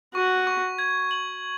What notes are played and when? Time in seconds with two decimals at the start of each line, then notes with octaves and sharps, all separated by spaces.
0.15 F#4 C#6
0.47 C#6
0.79 G#6
1.11 F#7